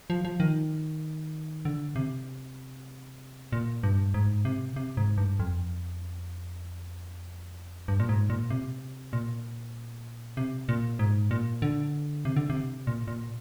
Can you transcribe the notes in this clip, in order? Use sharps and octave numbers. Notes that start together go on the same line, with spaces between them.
F3
F3
D#3
D3
C3
A#2
G2
G#2
C3
C3
G#2
G2
F2
G2
A#2
G#2
A#2
C3
A#2
C3
A#2
G#2
A#2
D3
C3
D3
C3
A#2
A#2